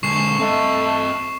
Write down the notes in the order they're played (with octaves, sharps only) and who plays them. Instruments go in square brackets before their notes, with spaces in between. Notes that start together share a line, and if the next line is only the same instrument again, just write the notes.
[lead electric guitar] D3 G#3 [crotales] C#6 C7 E7
[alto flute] A3 [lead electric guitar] C4 D#5